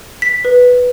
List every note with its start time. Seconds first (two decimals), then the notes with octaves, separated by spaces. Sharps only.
0.22 B6
0.45 B4